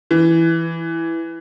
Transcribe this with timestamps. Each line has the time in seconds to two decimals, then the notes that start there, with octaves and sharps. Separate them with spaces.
0.11 E3